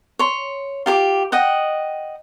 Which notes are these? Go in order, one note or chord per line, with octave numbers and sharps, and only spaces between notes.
C#5 C6
F4 G4 D6
D#5 F#5 G5